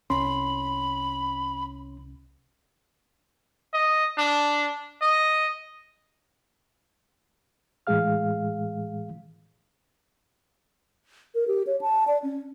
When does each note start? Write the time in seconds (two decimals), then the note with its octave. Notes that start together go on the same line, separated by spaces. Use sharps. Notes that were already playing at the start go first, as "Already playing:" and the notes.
0.10 C2 C#4 B5 C6
3.74 D#5
4.18 D4
5.02 D#5
7.87 A2 E3 G#3 G#4 F5 F6
11.35 A#4
11.48 G4
11.67 C#5
11.81 A5
12.08 D5
12.23 C#4